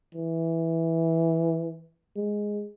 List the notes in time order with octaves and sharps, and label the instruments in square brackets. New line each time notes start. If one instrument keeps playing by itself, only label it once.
[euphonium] E3
G#3